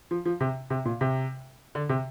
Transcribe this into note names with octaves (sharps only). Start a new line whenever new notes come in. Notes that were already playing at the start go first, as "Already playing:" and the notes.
F3
F3
C3
C3
A#2
C3
D3
C3